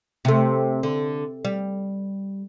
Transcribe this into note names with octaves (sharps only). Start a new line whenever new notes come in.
C3 A3
D3
G3